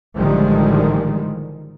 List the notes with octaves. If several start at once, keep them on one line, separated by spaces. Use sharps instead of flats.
A1 D3 D#3 F3 G3 G#3